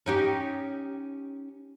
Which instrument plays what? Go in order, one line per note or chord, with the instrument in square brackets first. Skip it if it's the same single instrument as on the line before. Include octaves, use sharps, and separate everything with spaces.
[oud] C#4 D#4 G4